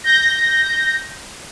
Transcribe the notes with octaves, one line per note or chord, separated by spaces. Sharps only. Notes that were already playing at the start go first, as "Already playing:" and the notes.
G6 A#6